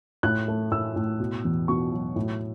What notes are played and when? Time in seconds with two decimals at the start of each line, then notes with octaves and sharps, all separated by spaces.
0.23 A2 F#6
0.48 A3
0.72 A2 E6
0.96 A2
1.20 B2
1.45 E2
1.68 B2 C#6
1.93 F#3
2.16 A2